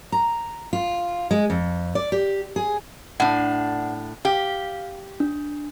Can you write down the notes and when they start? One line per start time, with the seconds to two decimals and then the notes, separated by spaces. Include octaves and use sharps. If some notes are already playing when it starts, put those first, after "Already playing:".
0.12 A#5
0.73 F4
1.31 G#3
1.50 F2
1.95 D5
2.12 G4
2.56 G#4
3.20 A2 D4 F#5
4.25 G4 F5
5.20 D4